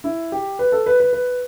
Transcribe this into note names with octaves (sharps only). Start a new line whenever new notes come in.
E4
G4
B4
A4
B4
B4
B4